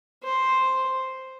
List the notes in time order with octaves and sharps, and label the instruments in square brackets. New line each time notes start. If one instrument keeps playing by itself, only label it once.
[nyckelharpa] C5